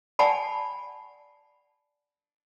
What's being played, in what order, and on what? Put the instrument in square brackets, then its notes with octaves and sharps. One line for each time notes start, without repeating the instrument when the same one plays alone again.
[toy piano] D5 F#5 G#5 A5 B5